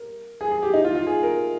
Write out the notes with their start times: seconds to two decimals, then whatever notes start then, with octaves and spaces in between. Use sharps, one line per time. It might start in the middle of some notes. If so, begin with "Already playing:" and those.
Already playing: A#4
0.41 G#4
0.51 G#4
0.63 G4
0.74 D#4
0.84 F4
0.95 F4
1.07 G#4
1.23 A#4